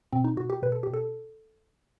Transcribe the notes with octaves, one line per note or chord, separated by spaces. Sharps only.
B2 C4
D#4
B2 F#4
G4
B2 B4
A4
B2 G4
A4